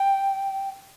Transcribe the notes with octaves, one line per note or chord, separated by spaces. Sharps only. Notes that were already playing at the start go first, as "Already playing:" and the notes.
Already playing: G5